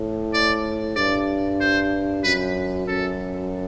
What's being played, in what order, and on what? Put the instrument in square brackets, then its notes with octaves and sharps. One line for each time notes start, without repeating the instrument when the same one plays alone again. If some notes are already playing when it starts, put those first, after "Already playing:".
Already playing: [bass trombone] A2
[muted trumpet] D5
[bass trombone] G2 [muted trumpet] D5
[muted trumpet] C5
[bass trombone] F#2 [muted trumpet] B4
[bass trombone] F#2 [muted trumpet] A4